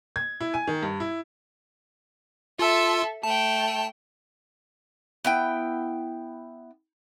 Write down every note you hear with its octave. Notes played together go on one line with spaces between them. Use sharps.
G#6
E4
G#5
D#3
G2
E4
F4 A4 E5 C6 E6
A3 G5 A5
B3 E4 G5